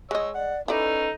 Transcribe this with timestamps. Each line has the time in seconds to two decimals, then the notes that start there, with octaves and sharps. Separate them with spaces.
0.11 G#3 C#5 D#5 E6
0.35 D5 F#5
0.68 C#4 D#4 E4 A4 B4 D5